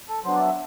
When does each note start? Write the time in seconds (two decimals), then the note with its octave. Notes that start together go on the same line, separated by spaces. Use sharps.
0.09 A4
0.25 F#3 B3 D4 C5
0.35 D5
0.40 E5